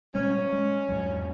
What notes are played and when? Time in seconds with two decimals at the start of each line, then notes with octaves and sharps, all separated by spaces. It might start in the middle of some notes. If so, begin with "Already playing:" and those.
0.15 A#2 G3 G#3 C#4
0.53 G#3
0.89 E2 G#2 F#3